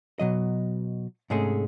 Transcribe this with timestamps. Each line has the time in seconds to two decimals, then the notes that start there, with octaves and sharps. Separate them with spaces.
0.19 B2 F#3 D#5
1.30 G#2 C3 G#3 A3 C#4 G#4